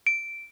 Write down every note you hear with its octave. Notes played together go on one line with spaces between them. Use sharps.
D7